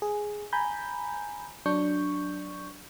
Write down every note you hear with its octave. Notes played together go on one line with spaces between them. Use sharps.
G#4
G#5 A#5 B5 G6
F#3 D4 C#6 G6